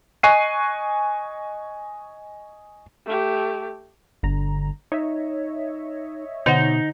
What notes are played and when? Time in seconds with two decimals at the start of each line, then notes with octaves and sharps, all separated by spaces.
0.23 D#5 G#5 C#6 F#6 C7 D#7
3.06 A3 G4
4.23 G1 D3 A#5
4.92 D#4 C#5 D#5 E5
6.46 B2 D3 D#4 F#5